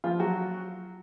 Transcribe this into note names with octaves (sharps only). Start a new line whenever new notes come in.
F3 F4
F#3 F#4